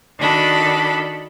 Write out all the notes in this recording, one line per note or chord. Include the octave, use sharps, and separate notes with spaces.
D#3 D4 F#4 A4 B5